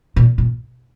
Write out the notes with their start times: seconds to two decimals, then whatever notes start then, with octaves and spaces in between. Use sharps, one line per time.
0.16 A#2
0.38 A#2